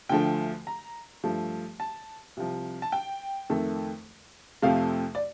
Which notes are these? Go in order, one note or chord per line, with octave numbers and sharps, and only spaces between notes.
D2 D3 F3 A3 G5
A#5
G2 F3 A3
A5
C2 C3 F3
A5
G5
F2 D#3 A3
F2 C3 F3 A3 F5
D5